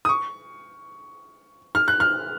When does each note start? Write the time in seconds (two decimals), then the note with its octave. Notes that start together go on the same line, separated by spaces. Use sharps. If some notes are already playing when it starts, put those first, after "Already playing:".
0.05 D#6
0.09 C#6
1.75 F6
1.88 F#6
2.00 F6